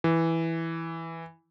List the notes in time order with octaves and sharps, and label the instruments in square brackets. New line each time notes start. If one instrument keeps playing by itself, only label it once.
[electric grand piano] E3